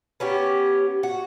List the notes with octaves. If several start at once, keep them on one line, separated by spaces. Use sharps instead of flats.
B3 C#4 F#4 G4
F#4